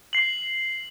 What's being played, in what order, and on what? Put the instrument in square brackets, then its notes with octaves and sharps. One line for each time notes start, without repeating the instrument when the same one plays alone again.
[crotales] C7 F#7